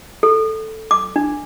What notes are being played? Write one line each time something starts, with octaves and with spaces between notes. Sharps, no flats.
A4
D6
D4